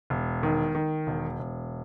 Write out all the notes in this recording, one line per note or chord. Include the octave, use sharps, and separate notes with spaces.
E1
D#3
D#3
E1
E1